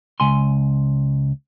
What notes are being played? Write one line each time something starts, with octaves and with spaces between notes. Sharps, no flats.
C#2 G#5 C6